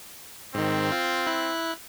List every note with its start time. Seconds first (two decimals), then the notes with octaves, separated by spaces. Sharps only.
0.55 G#2 D#3 C4
0.92 F4
1.27 E4 F#6